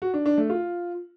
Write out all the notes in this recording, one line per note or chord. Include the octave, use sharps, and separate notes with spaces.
F#4
D4
D4
A3
F4